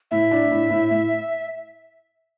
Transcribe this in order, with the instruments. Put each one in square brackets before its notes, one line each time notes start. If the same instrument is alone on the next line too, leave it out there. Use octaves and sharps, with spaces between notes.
[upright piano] A2 [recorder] E5
[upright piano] D4
A2
A2
A2